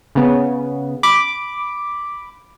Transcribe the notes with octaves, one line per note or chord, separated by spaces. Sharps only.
C#3 B3
B5 D6